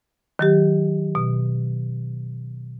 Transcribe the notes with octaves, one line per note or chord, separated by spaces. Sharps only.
D#3 F#3 G4
B2